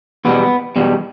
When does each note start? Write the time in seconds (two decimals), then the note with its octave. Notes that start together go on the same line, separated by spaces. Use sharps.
0.25 E2 B2 G3 B3
0.76 E2 B2 G3